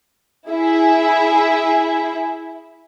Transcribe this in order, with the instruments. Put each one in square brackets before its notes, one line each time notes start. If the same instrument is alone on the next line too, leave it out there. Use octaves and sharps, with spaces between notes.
[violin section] E4 G#4 E5